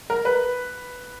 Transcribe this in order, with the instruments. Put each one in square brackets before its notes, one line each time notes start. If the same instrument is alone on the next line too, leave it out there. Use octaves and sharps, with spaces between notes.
[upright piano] A#4
B4